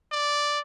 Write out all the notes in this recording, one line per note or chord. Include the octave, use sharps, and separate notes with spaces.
D5